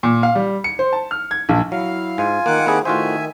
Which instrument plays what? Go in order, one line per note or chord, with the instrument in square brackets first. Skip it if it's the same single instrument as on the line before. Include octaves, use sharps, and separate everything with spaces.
[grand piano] A#2
F5
G3
C#7
C5
A5
F6
G#6
A#1
[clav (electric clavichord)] F#3 [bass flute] E4 [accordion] F5
[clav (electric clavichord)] G#2 [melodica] F4 G#5
[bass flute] D#3 [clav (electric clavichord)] A#3 [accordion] F#5 D6
[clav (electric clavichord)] A#3 G#4 [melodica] C4 E4 G4
[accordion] A2 [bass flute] D#3 [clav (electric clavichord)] F4 F#4 C5 [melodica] E5 G#5